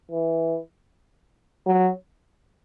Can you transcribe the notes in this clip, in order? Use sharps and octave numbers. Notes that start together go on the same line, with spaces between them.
E3
F#3